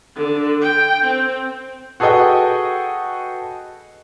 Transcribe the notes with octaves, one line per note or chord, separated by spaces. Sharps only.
D3
G5
C4
F#4 G#4 A4 B4 D#5 G5